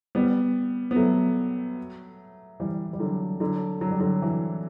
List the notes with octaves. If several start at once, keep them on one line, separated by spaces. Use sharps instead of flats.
G3 B3
B3
F#3 A3
E3 G3
G3
D3 F#3
D3 F#3
F#3
G3
D3 F#3
E3